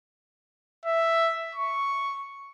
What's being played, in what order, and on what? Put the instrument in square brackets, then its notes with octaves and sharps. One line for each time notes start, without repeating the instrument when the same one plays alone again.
[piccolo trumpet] E5
C#6